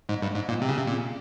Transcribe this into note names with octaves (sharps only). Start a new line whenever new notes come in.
G#2
G2
G#2
A#2
C3
C#3
C3
A#2